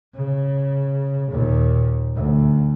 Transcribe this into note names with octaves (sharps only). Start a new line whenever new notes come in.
C#3
D#2 A#2
D2